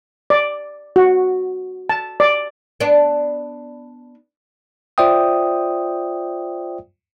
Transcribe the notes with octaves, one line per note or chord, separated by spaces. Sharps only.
D5
F#4
A5
D5
B3 D4
F4 C5 D5 E5 G5 D#6